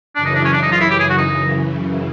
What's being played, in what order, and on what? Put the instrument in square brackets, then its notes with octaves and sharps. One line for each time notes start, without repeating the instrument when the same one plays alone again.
[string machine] F#2 C#3 E3 [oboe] D4
[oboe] D#4
D4
C#4
D4
D#4
F4
E4
G4
G#4
F#4
D#4